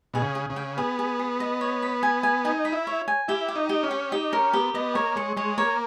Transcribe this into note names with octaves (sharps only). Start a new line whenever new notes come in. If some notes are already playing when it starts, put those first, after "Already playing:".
B2 G#4
C#3
G#4
C#3
G5
B3 G#4
G#4
G#4
D#5
C#5
B5
G#5
G#5
D#4 G#5
B5
E4
C#5
G#5
E4 G4
G4
D#4
G4
C#4
G4
D#4 G4
C#4 A#4
B3 G4
B3 D#5
A#3 C#5
G#3 C#6
G#3 C#5
A#3 C#5